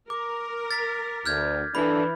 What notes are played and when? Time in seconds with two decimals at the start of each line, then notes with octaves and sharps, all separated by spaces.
0.10 A#4 D6
0.71 A6 B6
1.26 D2 F6 G6 G#6
1.75 E3 D4 A4 B5